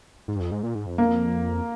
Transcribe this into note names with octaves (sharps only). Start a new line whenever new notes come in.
G#2
G2
F2
G#2
A#2
G#2
F2
A#3